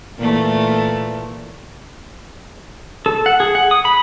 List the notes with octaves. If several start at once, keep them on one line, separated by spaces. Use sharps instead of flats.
A#2 E3 A3
A4
F#5
G#4
F#5
D#6
B5